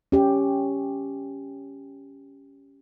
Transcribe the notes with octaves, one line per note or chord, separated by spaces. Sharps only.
C#4 G4